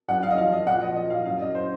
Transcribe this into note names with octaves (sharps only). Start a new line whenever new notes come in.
F#2 F#5
F#2 F5
D#5
F3 F5
F3 D#5
A#2 F#5
F3 D#5
F3 D#5
A#2 F5
F#2 F5
F#2 D#5
C5